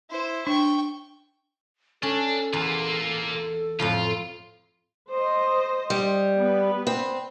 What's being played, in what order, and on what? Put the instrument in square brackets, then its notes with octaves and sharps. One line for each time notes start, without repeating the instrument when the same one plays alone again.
[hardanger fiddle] E4 C5
[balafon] D4 [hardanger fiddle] G5 C#6
[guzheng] C#4 [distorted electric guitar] D4 [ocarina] A4
[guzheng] E2 [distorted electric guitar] A#3 F4
[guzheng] F2 A2 F3 [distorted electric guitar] F4
[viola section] C5 D#5
[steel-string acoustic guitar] G3
[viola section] B3 B4
[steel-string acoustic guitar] C4